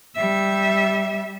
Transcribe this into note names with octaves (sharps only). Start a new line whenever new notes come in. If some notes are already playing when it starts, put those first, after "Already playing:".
G3 E5